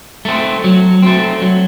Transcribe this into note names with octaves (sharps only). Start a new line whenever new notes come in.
A3 C4
F#3
A3 C4
F#3